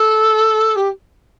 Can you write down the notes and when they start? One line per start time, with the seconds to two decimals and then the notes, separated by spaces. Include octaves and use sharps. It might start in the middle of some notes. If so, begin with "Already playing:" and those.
Already playing: A4
0.76 G4